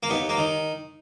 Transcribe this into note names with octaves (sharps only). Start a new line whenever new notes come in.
A#3
D#2 B3
A#3
D#3